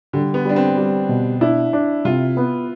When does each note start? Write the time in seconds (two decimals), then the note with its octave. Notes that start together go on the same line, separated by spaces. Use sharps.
0.13 D3 G3
0.34 B3
0.45 G3 D4
0.56 C4
0.77 G3
1.09 B2
1.41 D4 E4
1.73 D4
2.05 C3 F4
2.37 B3